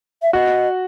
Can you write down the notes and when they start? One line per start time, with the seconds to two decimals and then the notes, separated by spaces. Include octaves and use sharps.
0.22 E5
0.33 F#4 D#5